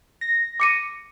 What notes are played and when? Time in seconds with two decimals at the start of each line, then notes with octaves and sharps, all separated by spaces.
0.21 A#6
0.60 D6 C#7 D#7